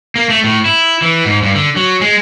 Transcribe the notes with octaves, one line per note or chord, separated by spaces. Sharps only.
A#3
A3
A2
E4
E3
G#2
G2
D3
F#3
G#3